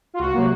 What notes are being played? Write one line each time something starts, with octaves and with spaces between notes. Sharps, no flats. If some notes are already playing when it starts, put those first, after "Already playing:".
F4
C#2 F#4
C3 F#3 A#3